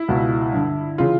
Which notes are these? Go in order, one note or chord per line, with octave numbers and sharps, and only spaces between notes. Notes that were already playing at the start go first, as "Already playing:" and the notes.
Already playing: E4
C#2 B2
G2 D3
C#3 E3 F4